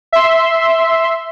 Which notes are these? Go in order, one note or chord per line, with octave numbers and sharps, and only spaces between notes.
E5 C6